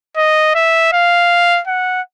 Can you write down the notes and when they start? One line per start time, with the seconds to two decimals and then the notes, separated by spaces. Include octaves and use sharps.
0.17 D#5
0.55 E5
0.93 F5
1.67 F#5